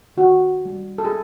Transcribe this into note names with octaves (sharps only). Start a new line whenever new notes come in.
D#3 F#4
G3
A4
G#4